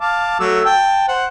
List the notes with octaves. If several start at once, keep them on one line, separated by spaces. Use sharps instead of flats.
F5 A5 D6
F#3 A3 E6
G5 A5
C5 F#5